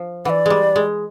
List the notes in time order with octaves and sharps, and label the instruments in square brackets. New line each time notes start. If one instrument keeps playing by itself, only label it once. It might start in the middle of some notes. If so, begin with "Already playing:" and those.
Already playing: [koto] F3
[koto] E3 [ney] D5 F#5
[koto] G3 G#3
G#3